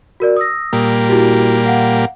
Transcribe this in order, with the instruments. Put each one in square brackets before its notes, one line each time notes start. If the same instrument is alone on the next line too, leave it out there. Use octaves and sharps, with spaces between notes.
[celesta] F#4 A#4 D5
D#6 E6 A#6
[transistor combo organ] A#2 G3 A#3
[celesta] E4 F#4 G4
F5 F#5